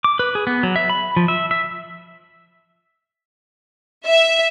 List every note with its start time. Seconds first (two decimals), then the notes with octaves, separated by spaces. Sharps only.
0.04 D6
0.19 B4
0.35 G#4
0.47 B3
0.63 F#3
0.76 E5
0.89 B5
1.17 F3
1.28 E5
1.51 E5
4.05 E5